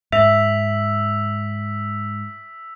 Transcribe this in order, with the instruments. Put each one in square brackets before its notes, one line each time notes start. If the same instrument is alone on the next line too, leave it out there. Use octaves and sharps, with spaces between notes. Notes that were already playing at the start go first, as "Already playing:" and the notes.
[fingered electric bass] G#2 [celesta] E5 [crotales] E6 B6 F7